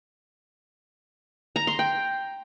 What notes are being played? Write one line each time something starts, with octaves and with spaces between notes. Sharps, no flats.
A#5
C6
G5